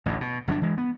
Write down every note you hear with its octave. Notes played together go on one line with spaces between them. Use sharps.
A1 D2 A2
B2
G1 F#3 C4 D4
E3 G#3
B3